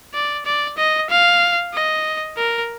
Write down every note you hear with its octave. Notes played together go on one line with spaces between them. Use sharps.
D5
D5
D#5
F5
D#5
A#4